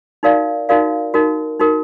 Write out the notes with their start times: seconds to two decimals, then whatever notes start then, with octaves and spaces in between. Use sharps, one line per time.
0.23 D#4 F#4 A#4 D5 F5
0.69 D#4 F#4 A#4 D5 F5
1.14 D#4 F#4 A#4
1.60 D#4 F#4 A#4